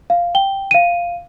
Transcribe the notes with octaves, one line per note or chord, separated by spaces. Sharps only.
F5
G5 G7
F5 D#7